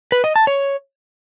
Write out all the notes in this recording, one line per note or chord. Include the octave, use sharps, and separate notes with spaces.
B4
D#5
A5
C#5